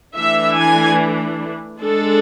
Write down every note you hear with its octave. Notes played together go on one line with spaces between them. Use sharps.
E3 A3 D4 E5
G#5
G#3 D4 A4